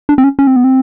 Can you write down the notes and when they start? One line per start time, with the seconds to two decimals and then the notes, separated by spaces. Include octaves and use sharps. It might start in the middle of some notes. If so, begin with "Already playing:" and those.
0.09 D4
0.18 C4
0.24 C#4
0.39 C#4
0.47 C4
0.56 B3
0.64 C4